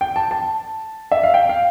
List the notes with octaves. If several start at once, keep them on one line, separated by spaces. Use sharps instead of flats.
G5
A5
A5
E5
F5
G5
F5